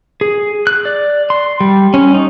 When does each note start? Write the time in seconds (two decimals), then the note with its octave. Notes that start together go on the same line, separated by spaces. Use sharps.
0.21 G#4
0.67 F#6
0.85 D5
1.30 C6
1.61 G3
1.94 C#4
2.15 D#4